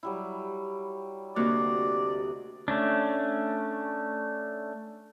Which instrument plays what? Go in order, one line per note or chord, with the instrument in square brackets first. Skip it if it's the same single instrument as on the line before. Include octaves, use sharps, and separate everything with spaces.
[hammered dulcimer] F#3 G3 E4
[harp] D2 A#3 F#4 [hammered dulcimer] C3 D#5 [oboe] D5
[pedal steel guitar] A3 C#4 D4